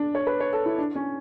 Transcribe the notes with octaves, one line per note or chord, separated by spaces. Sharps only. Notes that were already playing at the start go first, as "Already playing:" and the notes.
Already playing: D4
C#5
B4
C#5
A4
E4
D4
C#4